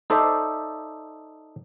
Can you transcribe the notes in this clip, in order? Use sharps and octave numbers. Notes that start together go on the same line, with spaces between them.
D#4 A4 C5 D5 E5